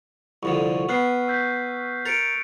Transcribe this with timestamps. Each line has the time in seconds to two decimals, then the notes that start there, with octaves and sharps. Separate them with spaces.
0.43 C2 F2 D3 C#6
0.89 B3 F6 F#6 C7
1.28 E6 G6 B6
2.06 A#4 A6 C#7 D7